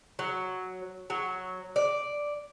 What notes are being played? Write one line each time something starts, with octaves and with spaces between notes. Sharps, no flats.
F#3
F#3
D5